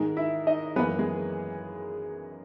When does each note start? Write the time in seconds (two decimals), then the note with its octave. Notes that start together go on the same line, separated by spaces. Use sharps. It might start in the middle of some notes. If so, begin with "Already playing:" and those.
Already playing: G#2 D#3 G#3
0.17 E4 E5
0.47 D#4 D#5
0.76 F#2 E3 A#3 B3 B4
0.99 G#3 G#4